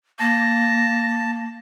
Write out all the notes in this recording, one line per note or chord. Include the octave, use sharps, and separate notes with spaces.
A#3 A5 A#6